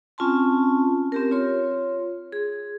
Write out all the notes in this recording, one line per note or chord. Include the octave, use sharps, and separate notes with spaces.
C4 C#4 F4 G#5 A5 C6
C4 G4 A#4
F4 C#5 C6
G#4